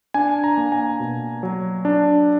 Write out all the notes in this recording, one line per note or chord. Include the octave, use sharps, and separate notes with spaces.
D4 G#5
A#5
A#3
G#5
B2
F#3
D4